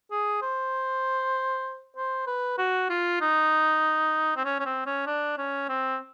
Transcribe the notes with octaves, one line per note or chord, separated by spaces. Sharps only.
G#4
C5
C5
B4
F#4
F4
D#4
C4
C#4
C#4
C4
C#4
D4
C#4
C4